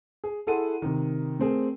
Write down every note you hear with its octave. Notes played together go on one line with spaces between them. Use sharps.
G#4
E4 G#4 A4 F#5 C6 D#7
C3 D#3
A3 C4 G#4 A#4